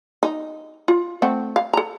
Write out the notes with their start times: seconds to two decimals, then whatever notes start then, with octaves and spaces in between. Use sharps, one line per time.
0.23 D#4
0.88 F4
1.22 A3 C4 F#5
1.56 F5
1.73 A4 A#5